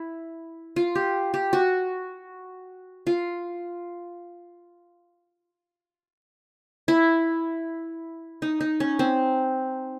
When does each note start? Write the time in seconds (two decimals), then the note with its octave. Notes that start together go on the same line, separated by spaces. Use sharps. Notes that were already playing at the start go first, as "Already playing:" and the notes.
Already playing: E4
0.76 F4
0.95 G4
1.34 G4
1.53 F#4
3.07 F4
6.88 E4
8.42 D#4
8.61 D#4
8.80 C#4
8.99 C4